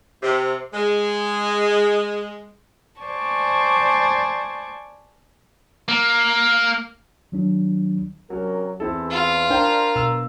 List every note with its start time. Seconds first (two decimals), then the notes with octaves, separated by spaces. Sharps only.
0.23 C3
0.74 G#3
3.01 C5 D5 G#5 A5 C#6
5.88 A#3
7.32 D#3 F#3 D4
8.30 C3 F#3 C#4 A#4
8.80 E2 C4 E4 A4
9.11 F4
9.50 D4 A#4 C5 G5
9.96 B2 E6